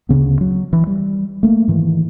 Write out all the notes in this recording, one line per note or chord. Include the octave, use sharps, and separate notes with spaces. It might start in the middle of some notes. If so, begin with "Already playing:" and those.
D2 C#3 B3
F#3
E3
G3
A3 A#3
G#2 D#3 E3